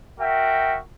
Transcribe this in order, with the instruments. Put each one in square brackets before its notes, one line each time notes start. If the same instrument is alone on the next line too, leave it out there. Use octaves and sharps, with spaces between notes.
[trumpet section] F#4 A#4 E5 G5